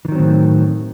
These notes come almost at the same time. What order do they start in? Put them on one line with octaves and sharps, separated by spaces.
E3 D#3 F#3 C4 A2